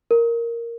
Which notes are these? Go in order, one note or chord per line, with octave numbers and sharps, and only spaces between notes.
A#4